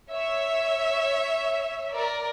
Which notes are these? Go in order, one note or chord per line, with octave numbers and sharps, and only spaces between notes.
C#5 E5
A#4 D5